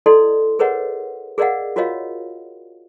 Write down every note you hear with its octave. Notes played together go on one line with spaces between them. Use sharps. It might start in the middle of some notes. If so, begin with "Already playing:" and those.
E4 A4 D5 D#5 C6
G#4 A#4 B4 C#5 D#5 F#5
G#4 A#4 D5 D#5 F5 F#5
F4 F#4 A#4 C#5 D#5 F5